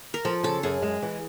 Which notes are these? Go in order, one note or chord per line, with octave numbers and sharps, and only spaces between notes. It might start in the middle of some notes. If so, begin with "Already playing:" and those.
A#4
F3 A4
C#3 A4
F#2 G#4
G#3
E3